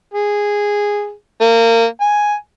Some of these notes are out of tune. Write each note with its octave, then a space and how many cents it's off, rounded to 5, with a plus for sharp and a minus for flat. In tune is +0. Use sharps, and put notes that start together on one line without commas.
G#4 -10
A#3 -25
G#5 +0